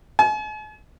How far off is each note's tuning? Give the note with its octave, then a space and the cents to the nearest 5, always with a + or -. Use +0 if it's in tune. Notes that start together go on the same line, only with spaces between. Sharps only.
G#5 +45